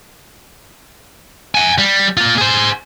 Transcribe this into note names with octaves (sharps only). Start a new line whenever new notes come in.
F#5 G#5
G3
A#3 F4
G#4 C5